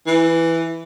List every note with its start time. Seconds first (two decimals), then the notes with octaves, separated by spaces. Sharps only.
0.07 E3